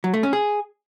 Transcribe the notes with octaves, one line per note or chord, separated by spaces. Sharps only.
F#3
A3
C#4
G#4